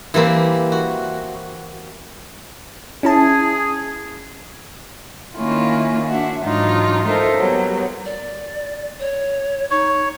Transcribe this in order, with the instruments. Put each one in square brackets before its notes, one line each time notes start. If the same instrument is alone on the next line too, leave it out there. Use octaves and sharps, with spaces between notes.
[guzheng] E3 G3 A#3 C4
F#4
[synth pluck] C#4 E4 A5 [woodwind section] G#4
[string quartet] D#3 A#3 C#4 E4 F4
D4 F#4 E5
G#2 E3 F#3 D4 D#4 F4
D#4 F4 A4 A#4 C5 E5
F#3 G3 A#3 B3
[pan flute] D5
C#5
[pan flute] D#4 [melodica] C#5